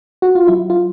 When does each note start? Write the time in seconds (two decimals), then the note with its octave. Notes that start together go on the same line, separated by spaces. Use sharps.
0.22 F#4
0.35 F4
0.48 F#3 E4
0.70 F4